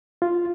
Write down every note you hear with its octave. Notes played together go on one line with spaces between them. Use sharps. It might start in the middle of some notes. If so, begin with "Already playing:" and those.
F4